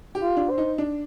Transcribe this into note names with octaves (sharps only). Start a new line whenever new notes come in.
G4
F4
D4
C5
D#4
D4